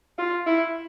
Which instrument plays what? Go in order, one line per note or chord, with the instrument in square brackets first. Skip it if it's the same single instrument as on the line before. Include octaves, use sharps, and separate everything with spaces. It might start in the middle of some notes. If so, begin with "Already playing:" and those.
[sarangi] F4
E4